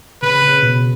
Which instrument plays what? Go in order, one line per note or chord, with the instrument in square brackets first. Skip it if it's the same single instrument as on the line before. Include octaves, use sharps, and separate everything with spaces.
[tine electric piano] C#3 [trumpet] B4
[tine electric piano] C#3
B2